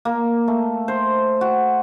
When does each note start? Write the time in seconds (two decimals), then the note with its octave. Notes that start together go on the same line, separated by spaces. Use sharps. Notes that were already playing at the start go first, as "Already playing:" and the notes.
0.05 A#3
0.48 A3
0.88 C5
1.41 F#4